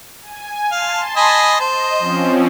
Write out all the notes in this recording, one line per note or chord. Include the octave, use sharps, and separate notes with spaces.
G#5
F5 A5 C6
D#5 G#5 B5
C5 D#5
F3 C4 C#4